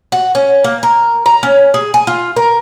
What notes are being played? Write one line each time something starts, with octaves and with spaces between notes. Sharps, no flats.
F#4
C#4
A#3
A#4
A#5
C#4
G#4
G#5
F4
A#4